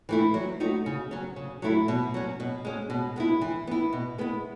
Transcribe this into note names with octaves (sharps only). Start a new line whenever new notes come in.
E3 A3 E4
F#3
A3 D#4 F#4
C#3
F#3 C#4
C#3
F#3 A3 E4
B2
F#3 C#4
B2
G#3 C#4
B2
G#3 B3 E4
E3
B3 E4
B2
G#3 B3 E4